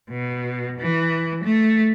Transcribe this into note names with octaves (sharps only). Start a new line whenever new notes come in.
B2
E3
A3